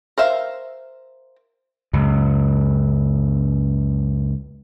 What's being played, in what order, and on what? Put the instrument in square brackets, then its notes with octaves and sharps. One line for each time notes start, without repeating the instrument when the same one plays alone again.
[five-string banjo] A#4 C5 E5 F5
[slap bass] C#2 F#2